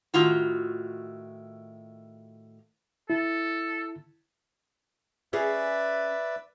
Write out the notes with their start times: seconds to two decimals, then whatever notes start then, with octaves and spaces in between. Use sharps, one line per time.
0.14 A2 D#3 F4 F#4
3.10 E4 A4
5.33 C#4 G#4 B4 D5 E5